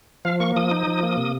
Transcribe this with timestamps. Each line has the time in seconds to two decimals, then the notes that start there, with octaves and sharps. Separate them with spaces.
0.25 F3 F5
0.40 A#3 C#6
0.56 F3 D#6
0.71 D#4
0.87 F3
1.03 A#3
1.17 C3